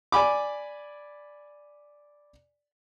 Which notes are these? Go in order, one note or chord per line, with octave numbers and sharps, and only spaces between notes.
D5 G#5 B5 D6